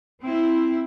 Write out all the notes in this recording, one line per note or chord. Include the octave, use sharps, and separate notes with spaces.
C4 E4